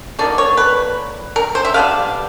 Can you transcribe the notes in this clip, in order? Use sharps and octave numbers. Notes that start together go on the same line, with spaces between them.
D3 F#3 A#3 D#4 D5
C#5
B4
A#4
C5
E5
D3 G3 B3 D4 F5